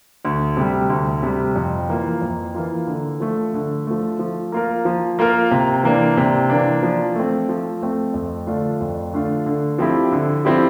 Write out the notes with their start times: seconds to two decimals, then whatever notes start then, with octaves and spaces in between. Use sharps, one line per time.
0.25 D2
0.57 C3 G3
0.90 D2
1.23 C3 G3
1.56 F2
1.89 E3 A#3 F4
2.22 F2
2.55 E3 A#3 F4
2.87 D3
3.20 F3 A3
3.54 D3
3.87 F3 A3
4.19 F3
4.52 A#3 F4 A#4
4.85 F3
5.19 A#3 F4 A#4
5.51 C3
5.83 E3 A#3 D4
6.17 C3
6.50 E3 A#3 D4
6.83 F3
7.15 A3 C4
7.49 F3
7.82 A3 C4
8.14 F2
8.47 D3 A3 D4 F4
8.81 F2
9.13 D3 A3 D4 F4
9.46 D3
9.78 F3 C4 E4 G4
10.12 D3
10.45 F3 C4 E4 G4